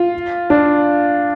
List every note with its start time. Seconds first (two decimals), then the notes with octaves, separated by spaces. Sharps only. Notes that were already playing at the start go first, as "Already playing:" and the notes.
Already playing: F4
0.50 D4